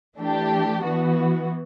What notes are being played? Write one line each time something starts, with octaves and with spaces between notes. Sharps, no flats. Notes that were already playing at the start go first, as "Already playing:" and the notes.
E3 A3 D4 G4
E3 B3 F#4